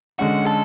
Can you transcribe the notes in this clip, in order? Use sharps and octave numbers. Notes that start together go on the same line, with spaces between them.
D3 G#3 C#4 F#4
A4